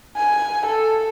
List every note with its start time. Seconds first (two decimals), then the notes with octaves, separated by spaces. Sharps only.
0.16 G#5
0.67 A4